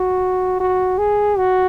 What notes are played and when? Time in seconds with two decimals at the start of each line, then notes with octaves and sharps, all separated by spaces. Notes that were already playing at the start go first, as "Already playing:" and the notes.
Already playing: F#4
0.60 F#4
0.98 G#4
1.38 F#4